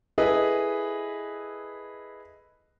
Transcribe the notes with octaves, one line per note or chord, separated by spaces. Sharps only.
E4 G#4 A4 B4 D#5